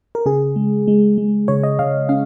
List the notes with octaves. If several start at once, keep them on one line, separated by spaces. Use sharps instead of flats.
A#4
C#3 G#4
G#3
G#3
G#3
C#3 C#5
D#5
C#3 F5
C#4 F5